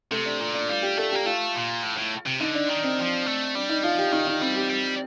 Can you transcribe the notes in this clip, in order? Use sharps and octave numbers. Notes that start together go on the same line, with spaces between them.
C3 A3
D4
A#2
D4
G3 F4
G4
A3 A4
A#3 G4
A3 F4
A#2
A2
A2
C3
D3 D#4
D4
D#3
C4
F3
A3
G3 D4
D#4
F3 F4
G4
D#3 D#4
D#4
G3 C4
G4
G3